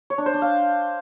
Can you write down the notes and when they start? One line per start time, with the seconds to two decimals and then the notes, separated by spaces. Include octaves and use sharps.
0.10 C#5
0.18 D4
0.26 C5
0.34 D4
0.42 F5